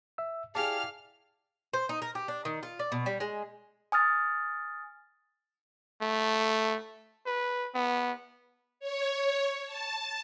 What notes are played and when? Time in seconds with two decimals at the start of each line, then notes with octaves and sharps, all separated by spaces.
0.18 E5 E6
0.55 E4 G4 G#4 D5 F5 G#5 A5 F6
1.73 C5
1.89 D#4
2.02 A#4
2.15 G4
2.28 D4
2.45 D#3
2.63 F4
2.79 D5
2.92 B2
3.06 G3
3.20 G#3
3.92 G#5 D#6 F6 A6
6.02 A3
7.26 B4
7.74 B3
8.80 C#5
9.66 A5